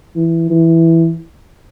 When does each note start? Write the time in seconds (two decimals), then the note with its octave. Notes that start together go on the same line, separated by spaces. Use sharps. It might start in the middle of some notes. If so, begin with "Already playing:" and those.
0.16 E3
0.50 E3